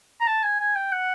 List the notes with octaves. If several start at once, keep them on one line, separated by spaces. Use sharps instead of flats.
A#5
A5
G#5
G#5
G5
F#5